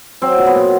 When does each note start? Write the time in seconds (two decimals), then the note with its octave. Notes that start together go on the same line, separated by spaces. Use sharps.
0.22 F#3 C4
0.38 A#2
0.46 B3
0.55 A#2